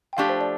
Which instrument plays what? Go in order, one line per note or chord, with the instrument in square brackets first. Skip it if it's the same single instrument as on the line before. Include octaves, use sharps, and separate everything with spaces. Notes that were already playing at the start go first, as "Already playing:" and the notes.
[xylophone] G5
[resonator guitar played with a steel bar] F3 A3 D4 G4 [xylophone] F5
[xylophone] C5
D5